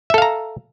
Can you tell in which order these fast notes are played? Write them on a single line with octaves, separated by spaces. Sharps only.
E5 A4 F5 A#5